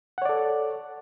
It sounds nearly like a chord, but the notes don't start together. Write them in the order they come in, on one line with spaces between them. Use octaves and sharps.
F#5 C#5 D5 A4